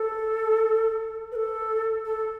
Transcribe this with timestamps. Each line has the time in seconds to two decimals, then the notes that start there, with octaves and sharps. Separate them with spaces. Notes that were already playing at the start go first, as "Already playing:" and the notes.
Already playing: A4
1.32 B4
1.36 A4
2.06 A4